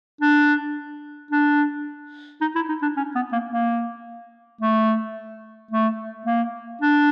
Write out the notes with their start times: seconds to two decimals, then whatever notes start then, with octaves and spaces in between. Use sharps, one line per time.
0.21 D4
1.31 D4
2.41 D#4
2.56 E4
2.69 D#4
2.82 D4
2.97 C#4
3.15 B3
3.32 A#3
3.52 A#3
4.61 A3
5.71 A3
6.26 A#3
6.82 D4